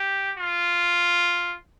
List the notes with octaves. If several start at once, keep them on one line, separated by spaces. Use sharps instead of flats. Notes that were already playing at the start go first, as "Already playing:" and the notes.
Already playing: G4
F4